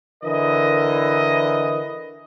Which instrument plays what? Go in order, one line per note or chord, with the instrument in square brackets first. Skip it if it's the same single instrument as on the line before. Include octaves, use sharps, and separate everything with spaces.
[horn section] D3 E3 A#4 D#5